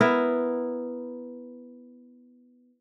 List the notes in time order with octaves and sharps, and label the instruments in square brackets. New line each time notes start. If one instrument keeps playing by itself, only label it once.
[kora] B3 E4 A#4